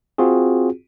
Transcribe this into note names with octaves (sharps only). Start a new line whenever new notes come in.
C4 F4 F#4 G#4